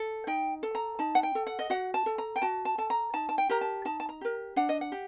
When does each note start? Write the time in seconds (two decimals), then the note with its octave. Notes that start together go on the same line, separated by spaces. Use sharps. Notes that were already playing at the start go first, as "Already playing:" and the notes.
Already playing: A4
0.27 D#4 G5
0.63 A4
0.75 A#5
0.99 D#4 A5
1.15 F#5
1.23 G5
1.35 A4
1.47 F#5
1.59 D#5
1.70 F#4 F#5
1.94 A5
2.06 A4
2.18 A#5
2.36 G5
2.42 F#4 A5
2.65 A5
2.78 A4 A5
2.90 A#5
3.13 D#4 A5
3.29 A5
3.38 G5
3.49 G4 A#4 A#5
3.61 A5
3.85 D#4 A5
4.00 A5
4.09 A#5
4.21 G4 A#4
4.56 D4 F#5
4.69 D#5
4.81 F#5
4.92 G4